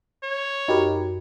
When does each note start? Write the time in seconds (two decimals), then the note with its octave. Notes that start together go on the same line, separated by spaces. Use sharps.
0.24 C#5
0.68 F#2 D#4 F#4 G4 A#4 B5